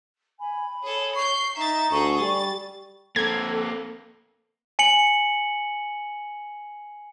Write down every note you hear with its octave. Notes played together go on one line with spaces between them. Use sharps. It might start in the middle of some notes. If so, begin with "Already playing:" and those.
G#5 B5
G#4 A4 C#5
C#6 G6 C7
D#4 E5 A#5 A6
D2 G#4 A4 C#6
G3 D5 A6
A#3 C4 A4 G#6
G#5 C#7 F#7